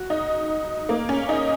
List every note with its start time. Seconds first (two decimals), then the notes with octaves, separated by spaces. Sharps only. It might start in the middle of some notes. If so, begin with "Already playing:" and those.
Already playing: F#4
0.10 D#4
0.89 A#3
1.09 C#4
1.29 D#4